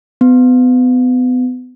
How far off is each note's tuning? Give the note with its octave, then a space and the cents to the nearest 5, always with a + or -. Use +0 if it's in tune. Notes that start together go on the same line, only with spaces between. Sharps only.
B3 +30